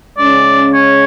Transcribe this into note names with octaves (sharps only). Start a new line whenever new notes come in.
C#3 G#3 C#4 D5
C#5